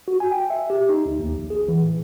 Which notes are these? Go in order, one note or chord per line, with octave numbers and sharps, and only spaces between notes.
F#4
G#5
G5
E5
G4
D#4
D2
D#2
A#1
G#4
E3
A2